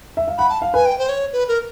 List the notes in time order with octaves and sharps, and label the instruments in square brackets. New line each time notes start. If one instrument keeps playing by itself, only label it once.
[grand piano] E5
F5
[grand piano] F#5 [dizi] B5
[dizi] A5
[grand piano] F5
[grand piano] B4 [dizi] G#5
[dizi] G5
C5
C#5
B4
A#4